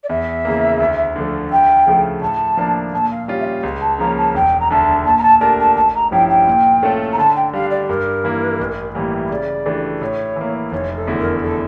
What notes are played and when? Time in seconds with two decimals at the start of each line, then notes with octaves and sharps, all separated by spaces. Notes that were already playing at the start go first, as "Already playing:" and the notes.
0.03 D5
0.09 E2 E5
0.45 C#3 E3 A#3
0.80 D2
1.16 D3 F3 A3
1.51 D2 G5
1.86 C#3 F3 A3
2.22 A2 A5
2.57 F3 A#3 D4
2.93 A#2 A5
3.11 F5
3.28 G3 C#4 F4
3.40 E5
3.46 F5
3.63 C#2
3.81 A5
3.99 C#3 F3 A#3 C#4 A#5
4.17 A5
4.34 E1 G5
4.60 A#5
4.70 D2 D3 A5
5.05 A#2 A5
5.18 A#5
5.23 A5
5.40 A3 D4 G4 A#4 A5
5.59 A5
5.76 A1 A5
5.94 A#5
6.11 G2 F3 C#4 E4 G5
6.29 G5
6.47 A#2
6.83 A3 C#4 F4 A4
7.12 A#5
7.18 D3 A5
7.36 G5
7.53 G3 D4 F5
7.70 D5
7.88 G2 A#4
8.24 E3 A#3 E4
8.59 A1
8.95 A2 E3 G3 A#3
9.31 C#3 D5
9.66 E3 A3 D4 G4
10.02 A2 C#5
10.36 E3 A#3
10.72 F1 C#5
10.96 A4
11.07 E2 D3 A3 E4
11.19 A#4
11.42 A4